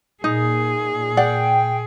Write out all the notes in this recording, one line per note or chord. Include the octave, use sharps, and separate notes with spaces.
A#2 D#4 G#4
D5 F#5 G5